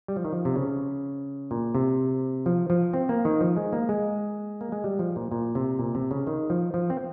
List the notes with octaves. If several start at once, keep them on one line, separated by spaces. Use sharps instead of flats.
G3
F3
D#3
F3
C3
C#3
A#2
C3
F3
F3
C4
A#3
D#3
F3
G#3
A#3
G#3
A#3
G#3
G3
F3
A#2
A#2
C3
A#2
C3
C#3
D#3
F3
F3
C4